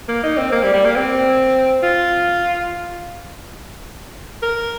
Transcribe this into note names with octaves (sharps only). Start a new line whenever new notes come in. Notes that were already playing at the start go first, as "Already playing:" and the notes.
A#3
D#4
C4
A#3
G3
G3
A#3
C4
F4
A#4